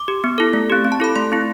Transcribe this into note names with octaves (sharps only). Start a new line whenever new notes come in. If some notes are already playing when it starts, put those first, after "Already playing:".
Already playing: D6
G4
B3
E4 A4
A3
C4 G4
C4
A5
E4 A4 B5
A3 C6
C4 E4